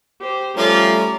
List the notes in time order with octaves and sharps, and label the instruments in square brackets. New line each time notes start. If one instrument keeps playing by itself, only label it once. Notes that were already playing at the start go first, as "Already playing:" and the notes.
[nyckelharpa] G4 C5
[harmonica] F3 [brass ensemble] G3 A3 [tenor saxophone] C#4 [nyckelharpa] A#5 D6